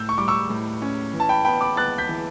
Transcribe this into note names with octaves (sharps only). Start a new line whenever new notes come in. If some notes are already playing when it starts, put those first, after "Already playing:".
Already playing: A2 E6 G6
C#6
G3 D6
C#6 E6
A2
C#4
E3
A5
G5 B5
B3 G5 B5
B5 D6
B3 F#6 A6
G6 B6
E3